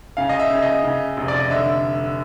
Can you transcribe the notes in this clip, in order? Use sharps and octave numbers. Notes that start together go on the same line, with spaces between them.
C#3 F5
D#5
E5
C#3
D#5
C#3
F1
D5
D#5
D3 E5